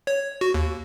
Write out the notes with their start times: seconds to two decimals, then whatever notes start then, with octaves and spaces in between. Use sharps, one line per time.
0.07 C#5
0.41 F#4
0.54 D#2